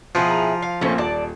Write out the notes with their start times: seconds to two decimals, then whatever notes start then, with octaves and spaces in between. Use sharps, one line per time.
0.15 B2 F3 E4 G#4
0.30 A#5 F7
0.62 F5
0.81 A#1 A3 A#3 C#4 C5
0.98 D#1 D5 A5